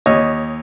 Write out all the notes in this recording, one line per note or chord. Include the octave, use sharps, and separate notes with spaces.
D#2 C#5 D#5